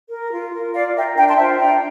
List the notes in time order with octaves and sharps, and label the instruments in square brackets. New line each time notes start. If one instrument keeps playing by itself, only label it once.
[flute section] A#4
F4
A#4
F4 D5 F5
A#4 E5 G5
D4 G5 A#5
A5 C6
F4 C5 E5
D4 G5 A#5